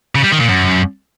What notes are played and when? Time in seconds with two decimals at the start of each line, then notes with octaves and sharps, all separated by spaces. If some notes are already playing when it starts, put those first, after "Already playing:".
0.15 C#3
0.23 G3
0.32 D#3
0.40 A#2
0.49 F#2